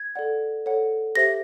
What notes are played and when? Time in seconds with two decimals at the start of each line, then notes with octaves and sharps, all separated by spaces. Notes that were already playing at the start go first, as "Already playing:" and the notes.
Already playing: G#6
0.16 A4 D5 F#5
0.66 A4 C#5 F#5
1.15 G4 C5 E5 A#6